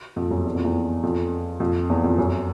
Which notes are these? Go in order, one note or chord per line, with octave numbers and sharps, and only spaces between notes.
F2
F#2
E2
F2
E2
F2
F2
E2
F2
F#2